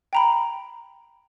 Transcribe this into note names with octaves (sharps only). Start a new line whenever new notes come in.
G5 A#5 B5